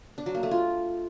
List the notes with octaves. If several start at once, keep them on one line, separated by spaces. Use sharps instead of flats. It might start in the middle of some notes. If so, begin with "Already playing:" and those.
D4
F#3
A#3
A3
F4